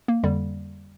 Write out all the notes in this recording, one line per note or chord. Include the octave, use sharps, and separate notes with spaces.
A#3
F2 D3 G3